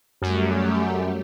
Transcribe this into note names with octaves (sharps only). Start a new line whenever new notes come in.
F#2 G3 A3 G4